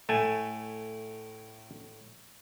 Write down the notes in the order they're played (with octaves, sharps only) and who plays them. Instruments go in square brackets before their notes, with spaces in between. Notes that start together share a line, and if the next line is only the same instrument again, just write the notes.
[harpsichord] A2 [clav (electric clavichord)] A3 G#5